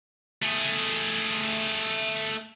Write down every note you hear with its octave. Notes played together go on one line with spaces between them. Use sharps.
A3 G#4